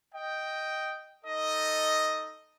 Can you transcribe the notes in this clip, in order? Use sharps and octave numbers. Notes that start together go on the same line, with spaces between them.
D#5 G5
D#4 A4 D#5